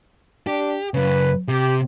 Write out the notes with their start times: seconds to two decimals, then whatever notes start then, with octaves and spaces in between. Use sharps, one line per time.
0.47 D4 G4
0.94 F#2 C#3 B4
1.48 C3 G4